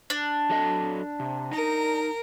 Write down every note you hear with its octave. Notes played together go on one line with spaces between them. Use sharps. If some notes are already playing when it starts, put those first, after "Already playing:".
D4
F#3 A4 D#5
C3
D#4 A#4